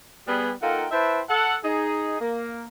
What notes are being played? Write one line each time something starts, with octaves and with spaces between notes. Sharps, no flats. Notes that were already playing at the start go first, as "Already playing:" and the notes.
G3 B3 G#4
A#3 D#4 F4 A4 F#5 G5
E4 B4 C5 E5 G5 A5
A4 F#5
D#4 G#4
A#3